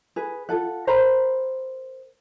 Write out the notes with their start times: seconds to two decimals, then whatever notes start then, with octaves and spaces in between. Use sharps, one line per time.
0.16 G#4 B4
0.49 F4 A4 F#5
0.87 A#4 C5 A#5 B5